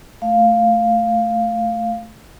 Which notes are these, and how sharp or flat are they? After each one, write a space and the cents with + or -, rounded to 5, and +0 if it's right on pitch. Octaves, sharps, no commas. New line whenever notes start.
A3 +0 F5 +0